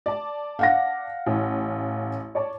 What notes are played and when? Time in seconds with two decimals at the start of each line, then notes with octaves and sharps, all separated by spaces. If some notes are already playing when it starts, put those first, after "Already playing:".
0.06 D5 A5
0.59 F5 F#5 A#6
1.26 A1
2.35 C#5 D5 A5